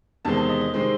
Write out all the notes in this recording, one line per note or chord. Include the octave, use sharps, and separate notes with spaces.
E2 C3 D#3 G#3 C4 A5
A5
D#5
D#5
C3 D#3 G#3 C4